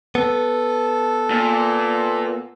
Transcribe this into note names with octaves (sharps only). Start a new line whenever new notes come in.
B3 A4
A#2